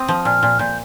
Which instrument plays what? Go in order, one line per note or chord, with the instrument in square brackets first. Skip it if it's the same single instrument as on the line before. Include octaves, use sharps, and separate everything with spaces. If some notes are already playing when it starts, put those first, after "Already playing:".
Already playing: [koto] C4 [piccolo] D#6
[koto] F3
[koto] A#2 [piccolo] F6
[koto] A#2
[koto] A#2 [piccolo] G6